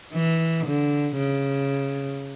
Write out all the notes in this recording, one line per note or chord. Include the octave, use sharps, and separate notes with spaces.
E3
D3
C#3